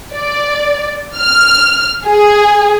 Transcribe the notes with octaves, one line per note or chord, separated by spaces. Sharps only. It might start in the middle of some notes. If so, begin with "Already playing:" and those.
D5
F6
G#4